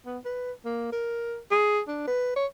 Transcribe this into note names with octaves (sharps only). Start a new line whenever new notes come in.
B3
B4
A#3
A#4
G#4
D4
B4
C#5